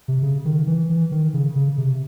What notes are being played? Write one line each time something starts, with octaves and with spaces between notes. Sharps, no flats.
C3
C#3
D#3
E3
E3
D#3
C#3
C#3
C3